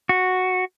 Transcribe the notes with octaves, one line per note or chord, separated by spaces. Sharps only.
F#4